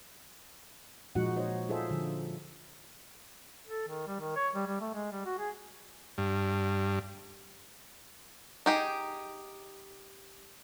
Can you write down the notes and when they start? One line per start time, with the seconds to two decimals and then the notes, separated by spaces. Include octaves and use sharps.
1.15 A#2 F3 G#3 D#4 F#4 F#5
1.37 D#4 C5 C#5 D#5
1.69 D#4 F4 G#4 A4 C5 E5
1.91 D3 F3
3.67 A4
3.88 D#3
4.07 G3
4.20 D#3
4.36 C#5
4.55 G3
4.67 G3
4.81 A3
4.94 G#3
5.11 G3
5.25 F#4
5.39 G#4
6.18 G2
8.66 D#4 G4 G#4